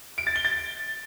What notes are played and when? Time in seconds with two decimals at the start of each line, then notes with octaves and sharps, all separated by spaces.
0.18 D7
0.27 A6
0.36 G7
0.45 A6